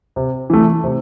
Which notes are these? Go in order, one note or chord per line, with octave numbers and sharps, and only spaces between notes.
C3
E3 A3
C3